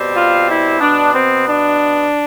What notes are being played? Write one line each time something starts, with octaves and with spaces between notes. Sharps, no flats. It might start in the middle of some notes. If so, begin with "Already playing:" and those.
Already playing: B2 G3 C4
F4
E4
B2 B3 D4
C4
D4